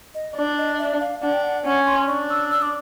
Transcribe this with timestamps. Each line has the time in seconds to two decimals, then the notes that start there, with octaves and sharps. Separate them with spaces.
0.15 D#5
0.36 D4
0.58 D#5
0.79 E5
1.00 F5
1.22 D4 F#5
1.33 G5
1.43 F#5
1.65 C#4 F#5
1.86 C6
2.08 D4 C#6
2.30 E6
2.51 E6
2.62 D6